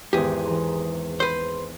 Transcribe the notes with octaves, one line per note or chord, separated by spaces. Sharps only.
G#1 E2 G4 G#4
E3 A#5 C6
B4 C5